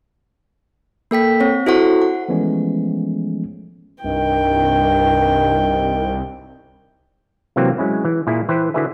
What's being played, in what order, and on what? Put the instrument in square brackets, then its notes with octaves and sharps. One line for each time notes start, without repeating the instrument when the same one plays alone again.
[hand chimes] A#3 A4 G5 B6
C4 C#5
E4 F#4 A4 C5 F#5 C#6
F#5
[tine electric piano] E3 F3 G#3 A3 B3 C#4
[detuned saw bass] C2 [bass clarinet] G2 [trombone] D#3 [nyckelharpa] G5
[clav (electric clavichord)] C3 E3 F#3 A#3 C4
F#3 G#3 C#4 E4
E3
A#2 A#3 E4 G#4
E3 B4 C5 G5
D3 E4 F#4 G#4 B4 E5